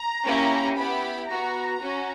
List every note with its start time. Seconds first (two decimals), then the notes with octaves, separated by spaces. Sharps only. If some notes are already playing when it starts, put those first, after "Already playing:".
Already playing: A#5
0.25 A#3 C#4 E4 G4
0.77 B3 E4 G4 B5
1.29 B3 F#4 A#5
1.81 C#4 F#4